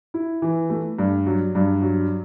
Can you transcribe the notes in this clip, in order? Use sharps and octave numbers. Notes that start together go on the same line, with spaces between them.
E4
E3
A3
G2
F#3
G2
F#3